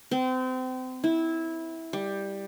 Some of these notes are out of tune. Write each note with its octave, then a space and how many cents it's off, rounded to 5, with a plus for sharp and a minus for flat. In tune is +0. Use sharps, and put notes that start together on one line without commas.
C4 -30
E4 -15
G3 +10